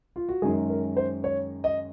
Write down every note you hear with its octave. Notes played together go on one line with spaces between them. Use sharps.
F4
F#4
F#2 D#3 G#3 G#4
A#4
C5
C#5
D#5